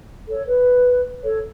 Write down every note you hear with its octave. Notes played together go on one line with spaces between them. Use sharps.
A4 C#5
B4
A4 C#5